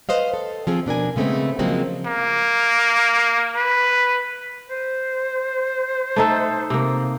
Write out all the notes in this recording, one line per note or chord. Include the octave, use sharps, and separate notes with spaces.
B4 C5 D#5 F5
A4
F3 C4 G#4
B2 D4 A#4 G#5
C#3 G#3 A3 B3 C4
C#3 F3 F#3 G#3 A#3 C4
A#3
B4
C5
A3 D#4 A4
C3 A#3